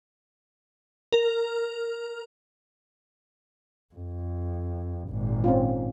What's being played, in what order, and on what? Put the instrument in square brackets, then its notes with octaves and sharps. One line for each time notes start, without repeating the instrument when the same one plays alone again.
[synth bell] A#4
[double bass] F2
G#1 A#2
[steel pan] C4 C#4 F4